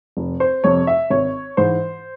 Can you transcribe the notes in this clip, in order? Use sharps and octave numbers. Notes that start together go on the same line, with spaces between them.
F1
C5
F2 C3 C#5
E5
G#1 C#5
G#2 E3 C5